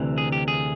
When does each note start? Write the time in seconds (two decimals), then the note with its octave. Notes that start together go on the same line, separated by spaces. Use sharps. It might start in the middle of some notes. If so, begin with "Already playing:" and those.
Already playing: D2 C3 E3
0.18 G#4
0.32 G4
0.48 G#4